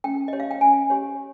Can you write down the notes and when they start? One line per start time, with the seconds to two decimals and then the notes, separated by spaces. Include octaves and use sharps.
0.04 C#4 G5
0.28 G4 C#5 D#5
0.40 F5
0.51 G5
0.61 C#4 G#5
0.90 G4 C#5